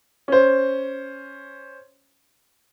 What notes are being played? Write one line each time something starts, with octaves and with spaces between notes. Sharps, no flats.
C#4 C5